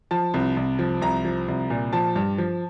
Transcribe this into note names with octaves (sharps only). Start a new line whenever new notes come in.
F3 A5
C2
C2
F3
C2 A#5
F3
C2
A#2
F3 A5
G2
F3